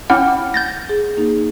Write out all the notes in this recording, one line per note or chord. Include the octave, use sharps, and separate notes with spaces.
C#4 E4 F#5 G5 D6 F6
G6 A6 A#6
G#4
A#3 D#4